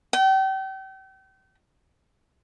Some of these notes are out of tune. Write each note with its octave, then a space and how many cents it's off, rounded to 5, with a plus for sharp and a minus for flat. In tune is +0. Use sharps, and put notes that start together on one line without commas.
G5 -35